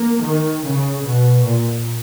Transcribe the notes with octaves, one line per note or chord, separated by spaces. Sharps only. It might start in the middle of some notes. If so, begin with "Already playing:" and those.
Already playing: A#3
D#3
C#3
B2
A#2